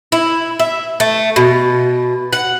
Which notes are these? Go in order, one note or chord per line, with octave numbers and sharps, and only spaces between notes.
E4
E5
A3
B2
F#5